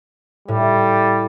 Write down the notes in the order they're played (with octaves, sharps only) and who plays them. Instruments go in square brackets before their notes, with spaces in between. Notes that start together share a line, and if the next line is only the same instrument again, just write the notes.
[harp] A2 [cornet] G3